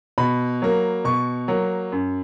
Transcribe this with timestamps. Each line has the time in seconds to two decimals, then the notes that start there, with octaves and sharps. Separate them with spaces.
0.18 B2 B5
0.62 F#3 A#3
1.05 B2 C#6
1.48 F#3 A#3
1.92 F#2